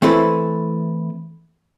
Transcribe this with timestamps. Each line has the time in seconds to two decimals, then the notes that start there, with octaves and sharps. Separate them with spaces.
0.02 E3 A3 C4 E4 A4 B4